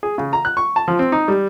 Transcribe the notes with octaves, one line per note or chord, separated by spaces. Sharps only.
G#4
C#3
A#5
F#6
C#6
A5
F3
C4
D#4
G3